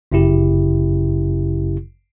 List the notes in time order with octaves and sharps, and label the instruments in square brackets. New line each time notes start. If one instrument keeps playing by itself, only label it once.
[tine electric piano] G1 F#2 C#3 E4 G4